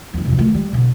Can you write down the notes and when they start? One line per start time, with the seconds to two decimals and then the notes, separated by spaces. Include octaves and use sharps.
0.14 E2 G2
0.25 C2 F2
0.38 D#3 A3
0.54 G3
0.73 B2 D3